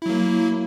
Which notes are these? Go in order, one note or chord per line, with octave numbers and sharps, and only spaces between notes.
F#3 A#3 E4